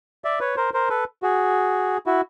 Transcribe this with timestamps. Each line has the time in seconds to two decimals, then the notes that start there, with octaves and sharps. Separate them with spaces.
0.24 D5 E5
0.40 B4 C#5
0.57 A#4 C5
0.74 A#4 C5
0.89 A4 B4
1.23 F#4 G#4
2.06 E4 F#4